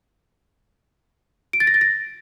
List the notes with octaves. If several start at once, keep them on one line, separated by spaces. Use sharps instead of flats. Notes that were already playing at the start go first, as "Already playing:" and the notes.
D7
A6
A#6
A6
A#6